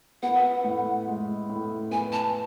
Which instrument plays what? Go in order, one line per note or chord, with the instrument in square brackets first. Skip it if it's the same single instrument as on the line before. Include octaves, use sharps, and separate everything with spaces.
[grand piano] B3 [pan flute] F#5
[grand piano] A2
G#3
A2
[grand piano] B3 [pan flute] G#5
[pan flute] A5